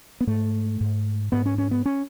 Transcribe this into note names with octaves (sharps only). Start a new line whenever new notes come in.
B3
G#2 A3
G#2
G#2 B3
C#4
C#4
B3
C#4